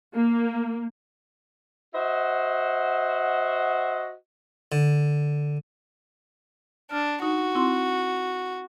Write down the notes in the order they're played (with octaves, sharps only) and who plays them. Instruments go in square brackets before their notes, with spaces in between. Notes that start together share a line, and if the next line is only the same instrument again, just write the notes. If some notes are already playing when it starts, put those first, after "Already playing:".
[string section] A#3
[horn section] F#4 C5 D#5 E5 F#5
[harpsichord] D3
[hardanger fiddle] D4 [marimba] F6
[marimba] D#4 [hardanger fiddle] F#4
[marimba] C4 E4 C6